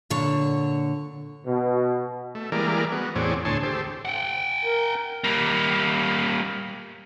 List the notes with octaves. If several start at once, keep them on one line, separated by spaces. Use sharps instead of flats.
A#2 D3 C#5
B2
A3
E3 G3 G#3 A#3 A#4 D5
B3 F#4
E2 A2 C4 G#4 C#5 D5
D2 A2 G#4 C#5 A5 C6
G4 A4 C5
F#5 G5
A#4
G3 A#3